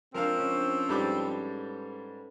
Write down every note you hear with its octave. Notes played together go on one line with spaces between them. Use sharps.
F3 G#3 C4 D4 A#4 F5
C#4
G#2 G3 A4 B4 D6 F#6